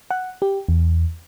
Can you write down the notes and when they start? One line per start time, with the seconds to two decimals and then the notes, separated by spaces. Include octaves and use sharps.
0.11 F#5
0.42 G4
0.68 E2